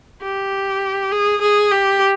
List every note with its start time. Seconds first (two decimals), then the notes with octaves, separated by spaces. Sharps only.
0.22 G4
1.12 G#4
1.41 G#4
1.71 G4